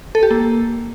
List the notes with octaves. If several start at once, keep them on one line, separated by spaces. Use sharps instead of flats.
A4
G4
A#3